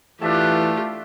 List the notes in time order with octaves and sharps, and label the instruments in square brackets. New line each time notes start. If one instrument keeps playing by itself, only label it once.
[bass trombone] E3 [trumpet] A3 [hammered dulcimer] D4 E5 A5 [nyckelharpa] F4 G4